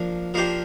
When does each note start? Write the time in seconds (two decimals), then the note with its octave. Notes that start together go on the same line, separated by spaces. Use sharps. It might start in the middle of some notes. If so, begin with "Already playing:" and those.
Already playing: F3 A#3 D4
0.34 F3 A#3 D4 G4 C5